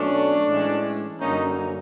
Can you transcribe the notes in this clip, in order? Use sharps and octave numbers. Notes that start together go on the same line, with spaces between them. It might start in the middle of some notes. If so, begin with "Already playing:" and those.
Already playing: B2 F#3 A3 C#4 D4
A2 E3 G#3 C#4
F#2 D3 G3 A#3 C#4 D#4